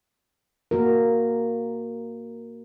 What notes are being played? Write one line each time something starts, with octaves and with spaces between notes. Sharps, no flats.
A#3 F#4 A#4